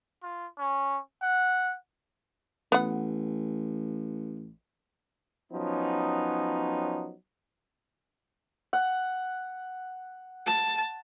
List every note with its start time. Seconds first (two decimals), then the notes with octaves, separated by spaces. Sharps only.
0.23 F4
0.59 C#4
1.22 F#5
2.72 A1 B3 F#5
5.52 F3 F#3 B3 C#4 D#4
8.73 F#5
10.46 A5